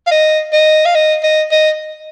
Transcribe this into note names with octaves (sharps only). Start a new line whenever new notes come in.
F5
D#5
D#5
F5
D#5
D#5
D#5